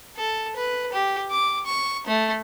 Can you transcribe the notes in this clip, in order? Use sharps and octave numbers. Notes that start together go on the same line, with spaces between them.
A4
B4
G4
D6
C#6
A3